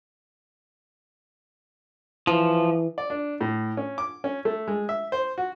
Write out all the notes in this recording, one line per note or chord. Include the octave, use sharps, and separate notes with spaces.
E3 F3
D5
D4
A2
C#4
D6
C#4
A3
G#3
E5
C5
F#4